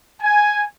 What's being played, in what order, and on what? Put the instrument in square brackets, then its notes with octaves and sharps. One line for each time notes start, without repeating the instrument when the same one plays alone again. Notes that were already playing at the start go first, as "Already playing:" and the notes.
[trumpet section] G#5